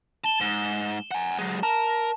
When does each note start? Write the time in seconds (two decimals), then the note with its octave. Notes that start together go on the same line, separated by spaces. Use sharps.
0.24 A5 E7 G7
0.40 G#2
1.11 F#5 G#5
1.39 F#3 G#3
1.63 A#4 A5